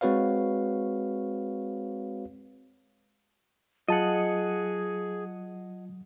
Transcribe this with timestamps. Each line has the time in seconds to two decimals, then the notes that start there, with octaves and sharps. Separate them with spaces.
0.01 G#3 C4 F#4 B4 C#5 F5
3.88 F#3 F4 G#4 D#5 F#5 A5